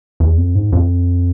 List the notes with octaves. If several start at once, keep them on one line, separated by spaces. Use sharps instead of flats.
E2
F2
G#2
F2